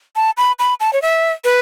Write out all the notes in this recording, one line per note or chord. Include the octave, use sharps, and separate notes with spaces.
A5
B5
B5
A5
C#5
E5
B4